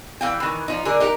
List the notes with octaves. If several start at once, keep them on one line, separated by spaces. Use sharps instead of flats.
E3 F5 G5
D#3 E3
F3 D#4
D3 G#4 A#4
D#4 G4 A#4